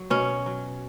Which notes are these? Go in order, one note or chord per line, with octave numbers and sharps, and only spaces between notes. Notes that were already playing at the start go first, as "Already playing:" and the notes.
Already playing: F#3
B2 C#4
F#3